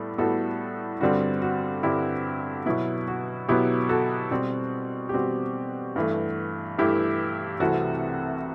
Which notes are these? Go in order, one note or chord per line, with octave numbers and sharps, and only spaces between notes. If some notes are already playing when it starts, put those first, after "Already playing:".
Already playing: A2 G3 B3 A4
A2 G3 B3 F#4 A4
G2 D3 G3 C4 F#4
F#4
G2 D3 G3 C4 E4 G4
B2 F#3 B3 E4
F#4
B2 F#3 B3 E4 G4
F#4 A4
B2 G3 C4
G4
B2 G3 C4 F#4
G2 E3 A3
G2 E3 A3 E4 G4
C2 C3 E3 A3 C4 F#4 A4